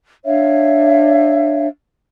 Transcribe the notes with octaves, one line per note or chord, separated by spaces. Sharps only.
D4 C#5 E5 F5